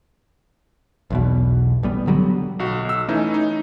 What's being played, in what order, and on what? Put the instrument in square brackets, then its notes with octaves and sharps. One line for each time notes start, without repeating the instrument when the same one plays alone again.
[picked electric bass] B1 E2 B2
A1 G3 B3
D3 F#3 G3 B3
[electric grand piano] B1 F#4
B1 E6
E3 A3 C#4 D#4
D#4